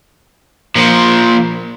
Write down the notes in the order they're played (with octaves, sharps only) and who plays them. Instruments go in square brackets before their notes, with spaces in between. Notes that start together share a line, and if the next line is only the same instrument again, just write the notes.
[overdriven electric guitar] A#2 F3